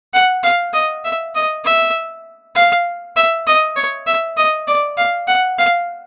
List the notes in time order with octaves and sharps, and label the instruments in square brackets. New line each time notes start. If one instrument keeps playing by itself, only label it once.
[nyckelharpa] F#5
F5
D#5
E5
D#5
E5
F5
E5
D#5
C#5
E5
D#5
D5
F5
F#5
F5